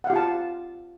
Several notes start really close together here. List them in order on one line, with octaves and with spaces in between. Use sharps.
F#5 F5 G4 F4 A5